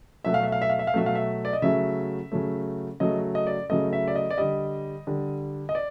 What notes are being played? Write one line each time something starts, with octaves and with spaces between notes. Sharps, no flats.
B2 F#3 A3 E5
F5
E5
F5
E5
F5
E5
F5
B2 F#3 A3 E5
F5
E5
D5
D#5
C#3 F#3 A3 E5
C#3 F#3 A3
C#3 F#3 A3 D#5
D#5
D5
C#3 F#3 A3 D#5
E5
D5
D#5
D5
D3 G3 D#5
D3 G3
D#5
D5